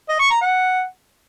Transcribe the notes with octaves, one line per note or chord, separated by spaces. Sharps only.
D#5
C#6
A#5
F#5